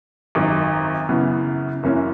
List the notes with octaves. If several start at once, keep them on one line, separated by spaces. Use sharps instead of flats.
G#1 F#2 D#3
F#2 C#3 E3 B3
F#1 F#2 E3 A#3 C#4